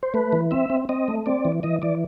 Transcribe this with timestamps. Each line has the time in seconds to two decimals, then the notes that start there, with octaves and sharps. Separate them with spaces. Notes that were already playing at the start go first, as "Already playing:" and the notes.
0.03 C5
0.14 A3 B4
0.33 E3
0.51 C4 E5
0.70 C4
0.89 C4 D#5
1.08 A3
1.26 C4 D5
1.45 E3
1.63 E3 D#5
1.82 E3 D5